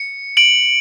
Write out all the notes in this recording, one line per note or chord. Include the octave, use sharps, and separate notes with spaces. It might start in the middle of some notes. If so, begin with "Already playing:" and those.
Already playing: C#7
D7 F#7